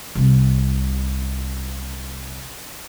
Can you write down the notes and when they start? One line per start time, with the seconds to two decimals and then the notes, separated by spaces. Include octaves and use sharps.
0.15 C2 C3